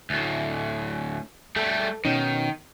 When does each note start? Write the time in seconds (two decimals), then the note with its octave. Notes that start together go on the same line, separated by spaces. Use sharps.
0.10 D2 A2
1.56 G3 A3 A4
2.05 B2 D#3 C#4 D#4